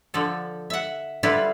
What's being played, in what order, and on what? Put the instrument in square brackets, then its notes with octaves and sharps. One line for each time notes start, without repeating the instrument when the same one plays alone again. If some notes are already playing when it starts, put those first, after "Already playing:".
[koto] D3 F3 A4
E5 F#5
D3 G3 E4 F4 B4